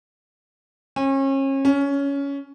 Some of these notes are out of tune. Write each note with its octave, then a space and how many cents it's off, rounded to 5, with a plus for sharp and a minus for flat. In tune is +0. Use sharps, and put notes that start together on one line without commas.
C#4 -35
C#4 +15